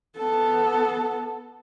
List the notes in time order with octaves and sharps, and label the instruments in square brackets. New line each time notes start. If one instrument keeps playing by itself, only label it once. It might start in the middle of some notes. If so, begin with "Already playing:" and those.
[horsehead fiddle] B3 A4